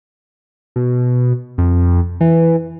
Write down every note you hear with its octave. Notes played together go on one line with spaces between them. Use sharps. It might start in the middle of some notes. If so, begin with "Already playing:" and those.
B2
F2
E3